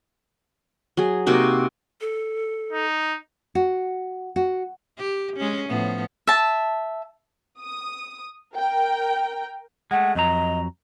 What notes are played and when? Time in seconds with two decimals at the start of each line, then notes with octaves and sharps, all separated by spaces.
0.97 F#3 G#4
1.26 C3 A#3 D#4 F#4
2.01 A4
2.73 D#4
3.55 F#4
4.36 F#4
4.98 G4
5.37 G#3 C#4
5.69 A2 F3 B3
6.27 E5 A5
7.61 D#6
8.55 A#4 G5
9.91 G#3 A3 F#5
10.15 F2 F#3 D#5 A#5